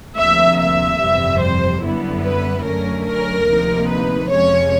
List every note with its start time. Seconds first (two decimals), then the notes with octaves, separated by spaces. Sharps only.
0.17 D2 C3 F3 A#3 E5
0.58 E5
0.99 G1 F2 C3 E3 G3
1.41 C5
1.82 F#2 D3 G3 B3 E4
2.24 B4
2.65 F#2 D3 F#3 A3 C#4 A#4
3.06 A#4
3.48 D2 C3 F3 A#3 D#4
3.89 B4
4.30 F2 C3 F3 G#3 C#4 C#5